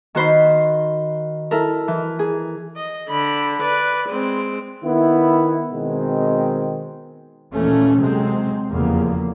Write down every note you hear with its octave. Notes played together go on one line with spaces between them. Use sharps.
D#3 F#4 C5 B5
E4 A4 A#4
E3
G#4
D#5
D3 B5
B4 D5
G#3 C4
D#3 B3 E4
B2 D#3 G#3 C4
D#2 A#2 E3 A3 C#4
C3 F#3 G#3 C4
F1 E2 C#3 A#3